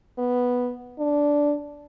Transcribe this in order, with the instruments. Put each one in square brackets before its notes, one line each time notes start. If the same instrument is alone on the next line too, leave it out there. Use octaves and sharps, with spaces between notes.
[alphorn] B3
D4